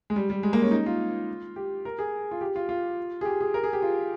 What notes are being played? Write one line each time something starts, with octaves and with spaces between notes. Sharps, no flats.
G#3
G3
G3
G#3
A#3
C#4
D#4
F4
G4
A#4
G#4
F4
G4
F4
F4
G#4
G4
G#4
A#4
G#4
G4
F4